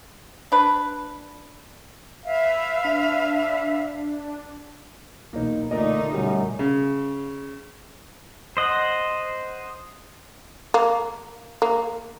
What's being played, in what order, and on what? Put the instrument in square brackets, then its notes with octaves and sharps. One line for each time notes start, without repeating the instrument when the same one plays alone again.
[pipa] D4 B4
[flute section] B4 E5 F5
[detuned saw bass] D4
[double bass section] B1 E2 B2 [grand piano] A#3 D#4
[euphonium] A#2 [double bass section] D3 [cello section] A3 D#4 [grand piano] A#4 D5 D#5
[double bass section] B1 [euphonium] F#2 [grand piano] G3
[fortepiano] C#3
[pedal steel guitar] C5 D#5 F#5
[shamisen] A#3
A#3